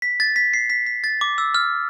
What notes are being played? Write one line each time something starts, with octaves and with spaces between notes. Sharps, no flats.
B6
A6
B6
C7
B6
B6
A6
D6
E6
F6